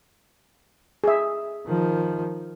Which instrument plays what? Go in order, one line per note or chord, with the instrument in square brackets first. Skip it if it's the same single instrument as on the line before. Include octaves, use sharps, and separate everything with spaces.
[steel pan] G#4 E5
[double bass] D#3 F3